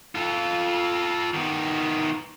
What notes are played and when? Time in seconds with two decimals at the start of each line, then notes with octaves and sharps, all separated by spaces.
0.15 F4 A4
1.34 D#3 B3